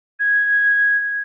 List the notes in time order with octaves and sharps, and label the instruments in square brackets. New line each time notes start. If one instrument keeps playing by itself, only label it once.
[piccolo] G#6